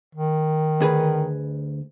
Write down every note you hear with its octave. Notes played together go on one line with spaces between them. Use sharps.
D#3
D2 G#4 B4